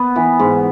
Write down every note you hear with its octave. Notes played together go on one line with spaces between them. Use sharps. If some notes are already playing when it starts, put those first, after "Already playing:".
Already playing: B3
E3
G#2